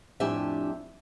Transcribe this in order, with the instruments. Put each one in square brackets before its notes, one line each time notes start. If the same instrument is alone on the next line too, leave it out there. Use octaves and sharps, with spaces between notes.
[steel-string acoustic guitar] F2 A2 D4 G4 E5 G#5